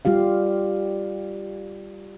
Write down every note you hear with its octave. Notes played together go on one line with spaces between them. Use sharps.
G3 F4 G4 F5